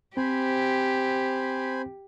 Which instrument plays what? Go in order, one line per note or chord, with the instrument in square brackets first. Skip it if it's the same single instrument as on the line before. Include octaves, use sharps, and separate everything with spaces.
[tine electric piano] C4 [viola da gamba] G4 [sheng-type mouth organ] C5 G#5 B5